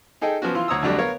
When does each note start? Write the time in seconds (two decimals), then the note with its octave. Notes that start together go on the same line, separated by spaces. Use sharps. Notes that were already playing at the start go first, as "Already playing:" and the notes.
0.22 D#4 G#4 A4 D#5 G5
0.42 F3 B3 C#4 F#4
0.55 E3 F4 C6
0.68 D2 C#5 A#5 D#6 E6
0.82 F2 D3 F#3 G3 A3 D4
0.98 B3 A#4 C#5 F5